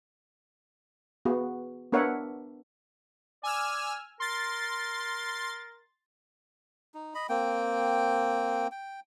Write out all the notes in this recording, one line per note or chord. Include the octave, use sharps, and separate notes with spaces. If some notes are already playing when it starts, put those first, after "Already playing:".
B3 F#4 G#4
B3 D4 A#4 C#5 E5 F#5
D5 G#5 E6 F6
A#4 C6 A6
D#4
D#5 B5
A#3 C4 G5
G5